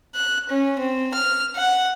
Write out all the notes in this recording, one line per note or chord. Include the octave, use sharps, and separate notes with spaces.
F#6
C#4
C4
F6
F#5